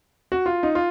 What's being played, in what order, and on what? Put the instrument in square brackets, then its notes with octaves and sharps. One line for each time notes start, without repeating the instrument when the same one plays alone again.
[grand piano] F#4
F4
D#4
F4